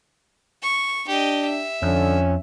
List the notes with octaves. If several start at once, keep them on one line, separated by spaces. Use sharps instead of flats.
C#6
D4 G4 D#5
E5
F2 D3 C#4